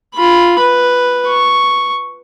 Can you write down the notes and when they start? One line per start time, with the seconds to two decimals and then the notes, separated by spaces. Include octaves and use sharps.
0.15 F4 B5
0.60 B4
1.28 C#6